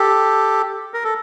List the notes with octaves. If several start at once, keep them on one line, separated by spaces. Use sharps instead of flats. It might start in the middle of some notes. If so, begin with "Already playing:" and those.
Already playing: G4 A4
A#4
A4